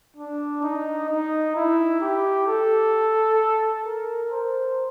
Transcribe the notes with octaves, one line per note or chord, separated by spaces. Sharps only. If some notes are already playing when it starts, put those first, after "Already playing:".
D4
D#4
D#4
E4
G4
A4
A#4
C5